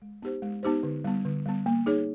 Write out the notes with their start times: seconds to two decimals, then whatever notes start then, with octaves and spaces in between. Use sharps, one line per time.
0.02 G#3
0.22 B3 D#4 G4 C5
0.42 G#3
0.63 B3 D#4 G4 C5
0.83 D3
1.04 G3 B3
1.25 D3
1.46 G3 B3
1.66 A#3
1.86 D#4 G#4 C#5